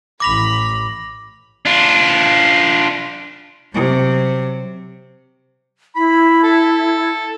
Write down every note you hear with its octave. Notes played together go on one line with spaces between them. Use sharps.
A1 B5 D6 A#6 F7
D4 F4
C3 F#3
E4 B5
A4